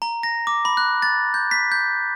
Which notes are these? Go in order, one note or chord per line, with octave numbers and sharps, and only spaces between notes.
A#5
A#6
D6
B5
F#6
A6
G6
B6
G6